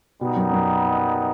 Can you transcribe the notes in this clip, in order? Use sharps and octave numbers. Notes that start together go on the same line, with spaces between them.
B2 G3 B3 D#4
F#2
F#2